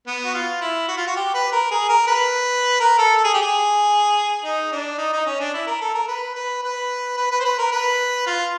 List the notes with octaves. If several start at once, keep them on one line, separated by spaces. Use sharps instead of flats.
B3
F#4
F4
E4
F#4
F4
F#4
G4
B4
A#4
G#4
A#4
B4
A#4
A4
A4
G#4
G4
G#4
D#4
D4
D#4
D#4
C#4
D4
E4
A#4
A4
A#4
B4
B4
B4
B4
B4
C5
B4
A#4
B4
F4